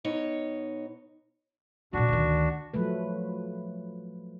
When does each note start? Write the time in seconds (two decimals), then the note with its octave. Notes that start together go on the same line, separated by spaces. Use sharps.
0.05 B2 D#4 C#5
1.93 F2 A#2 D4 F#4
2.08 D2 D#3
2.74 F3 F#3 A3 B4